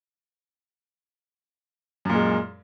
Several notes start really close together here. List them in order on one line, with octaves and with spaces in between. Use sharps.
F#2 A#2 G#3